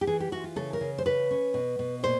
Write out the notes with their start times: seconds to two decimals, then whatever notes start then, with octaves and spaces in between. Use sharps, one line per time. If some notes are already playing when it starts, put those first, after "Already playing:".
0.01 G4
0.07 E3 G#4
0.20 G4
0.32 E3 F#4
0.44 F4
0.56 C#3 A4
0.73 A#4
0.81 C#3
0.98 C5
1.06 C#3 B4
1.31 C#4
1.54 B2
1.79 B2
2.03 A#2 C5